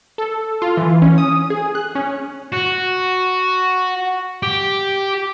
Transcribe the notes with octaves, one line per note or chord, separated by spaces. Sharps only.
A4
F4
E3
C#4
D#6
G#4
F#6
C#4
F#4
G4